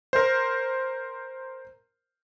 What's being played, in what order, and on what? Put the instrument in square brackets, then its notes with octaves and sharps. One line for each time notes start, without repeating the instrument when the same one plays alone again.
[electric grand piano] A#4 C5